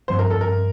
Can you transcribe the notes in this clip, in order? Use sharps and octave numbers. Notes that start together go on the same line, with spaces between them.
G2 F3 C4 C5
A#4
A4
A#4